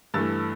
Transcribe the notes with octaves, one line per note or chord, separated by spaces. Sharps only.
G2 E3 A3 E6 A6